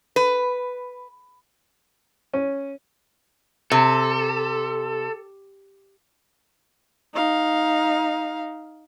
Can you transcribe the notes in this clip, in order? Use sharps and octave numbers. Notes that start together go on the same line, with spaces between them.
B4
C#4
C3 A4
D#4 F5